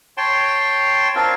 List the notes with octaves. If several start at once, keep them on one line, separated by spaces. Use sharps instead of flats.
C#5 G5 A5 C6
C4 D4 F4 A#4